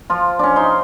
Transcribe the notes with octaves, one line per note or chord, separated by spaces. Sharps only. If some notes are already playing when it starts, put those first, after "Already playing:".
F3 F4
C#4 D4
D#4 C6